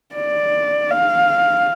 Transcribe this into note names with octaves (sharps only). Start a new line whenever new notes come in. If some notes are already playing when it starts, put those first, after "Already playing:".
D5
F5